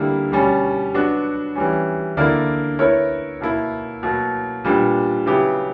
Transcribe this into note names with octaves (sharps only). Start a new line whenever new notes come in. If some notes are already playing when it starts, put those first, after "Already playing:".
Already playing: D3 G3 A#3 E4
B2 G3 C#4
F#3 B3 D4 F#4
E3 G3 C#4
D3 A#3 E4 A#4 D5
B3 E4 A#4 C#5
B2 A#3 E4
B2 F#3 A#3
A#2 G3 B3 D4
C#3 F#3 B3 E4 G4